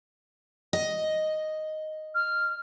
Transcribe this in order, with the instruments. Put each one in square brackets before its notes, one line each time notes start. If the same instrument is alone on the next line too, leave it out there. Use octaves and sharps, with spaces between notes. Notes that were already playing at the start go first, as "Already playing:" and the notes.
[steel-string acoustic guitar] D#5
[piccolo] F6